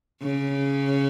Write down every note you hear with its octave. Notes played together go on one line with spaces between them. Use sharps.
C#3